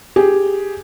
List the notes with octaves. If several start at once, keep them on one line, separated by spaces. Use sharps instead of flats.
G4 G#4